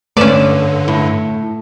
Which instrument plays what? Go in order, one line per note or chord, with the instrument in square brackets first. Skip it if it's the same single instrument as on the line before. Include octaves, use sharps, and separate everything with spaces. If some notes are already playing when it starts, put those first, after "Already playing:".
[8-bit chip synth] G2 D3 [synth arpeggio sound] A3 B4 E7 [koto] C#4 D5
[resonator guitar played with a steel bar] A2